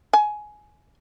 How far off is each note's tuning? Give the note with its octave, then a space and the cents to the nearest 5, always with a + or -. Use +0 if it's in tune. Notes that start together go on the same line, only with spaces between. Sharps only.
G#5 +15